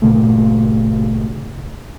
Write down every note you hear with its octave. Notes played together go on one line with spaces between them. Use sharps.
G1 A#2 C#3 A3